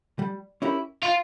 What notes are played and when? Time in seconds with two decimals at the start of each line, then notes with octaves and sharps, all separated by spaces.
0.19 G3
0.62 C#4 E4 G4 A#4
1.03 F4